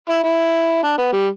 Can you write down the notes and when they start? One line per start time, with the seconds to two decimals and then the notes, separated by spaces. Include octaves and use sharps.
0.09 E4
0.23 E4
0.83 D4
0.98 B3
1.12 G3